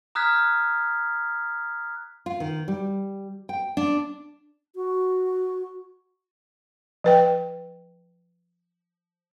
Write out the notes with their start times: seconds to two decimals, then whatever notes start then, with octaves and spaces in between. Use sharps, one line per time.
0.15 A#5 D#6 F6 F#6 G#6 B6
2.26 F4
2.40 D#3
2.68 G3
3.49 G5
3.77 D4
4.76 F#4
7.04 F3 B4 G5